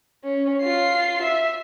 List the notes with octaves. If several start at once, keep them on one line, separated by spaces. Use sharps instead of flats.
C#4
F4 C7
E5